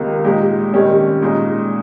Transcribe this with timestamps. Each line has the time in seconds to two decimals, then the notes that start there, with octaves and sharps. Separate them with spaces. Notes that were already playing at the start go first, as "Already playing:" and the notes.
Already playing: C#2 C3 D#3 A#3
0.24 A#2 G#3 D#4 G4
0.73 C3 D#3 G3 C#4
1.22 A#2 G#3 D#4